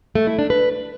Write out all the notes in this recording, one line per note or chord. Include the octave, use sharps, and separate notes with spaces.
A3
E4
D4
B4